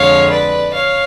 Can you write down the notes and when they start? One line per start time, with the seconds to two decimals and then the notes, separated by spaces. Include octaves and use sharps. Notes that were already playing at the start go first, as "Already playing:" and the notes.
Already playing: F2 D3 G#3 C#5 F5
0.30 B4 D5
0.75 C#5 F5